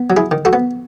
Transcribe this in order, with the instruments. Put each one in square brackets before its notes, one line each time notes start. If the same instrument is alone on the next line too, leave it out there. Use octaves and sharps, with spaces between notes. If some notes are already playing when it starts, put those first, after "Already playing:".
Already playing: [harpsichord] B3
F#3
E4 G#4
D#3
F#4 A4
B3